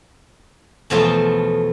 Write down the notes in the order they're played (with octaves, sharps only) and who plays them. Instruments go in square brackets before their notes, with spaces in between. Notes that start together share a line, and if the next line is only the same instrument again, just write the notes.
[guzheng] E2 B2 F3 A3 F4